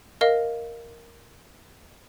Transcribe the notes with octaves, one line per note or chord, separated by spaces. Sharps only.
A#4 D#5 F5